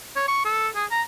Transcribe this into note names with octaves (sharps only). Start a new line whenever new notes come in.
C#5
C#6
A4
G#4
A#5